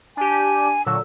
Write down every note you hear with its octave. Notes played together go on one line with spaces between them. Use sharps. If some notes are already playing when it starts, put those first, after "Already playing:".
D4 G4 G#5
A#2 D3 F#3 E6